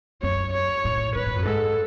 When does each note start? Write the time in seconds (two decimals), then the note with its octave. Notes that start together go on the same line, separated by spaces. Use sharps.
0.22 F#2 C#5
0.53 C#5
0.84 A2
1.15 A2 B4
1.26 G#2
1.36 F#2
1.45 G#2 A4